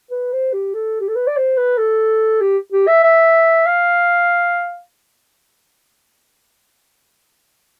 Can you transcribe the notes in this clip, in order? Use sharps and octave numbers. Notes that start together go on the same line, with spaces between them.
B4
C5
G4
A4
G4
A4
B4
D5
C5
B4
A4
G4
G4
E5
E5
F5